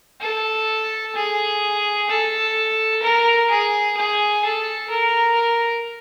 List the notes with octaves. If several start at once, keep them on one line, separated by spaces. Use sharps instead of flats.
A4
G#4
A4
A#4
G#4
G#4
A4
A#4